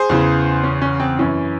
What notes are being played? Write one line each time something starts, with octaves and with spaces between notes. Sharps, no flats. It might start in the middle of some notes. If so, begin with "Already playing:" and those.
Already playing: G#4 C5
E2 C#3 E3
C#4
C#4
C4
F#2 E3 C#4